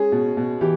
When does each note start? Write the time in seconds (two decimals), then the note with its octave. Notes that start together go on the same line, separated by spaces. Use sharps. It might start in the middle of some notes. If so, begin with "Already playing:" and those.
Already playing: G#3 C#4 G#4
0.12 B2
0.37 B2
0.61 E3 G4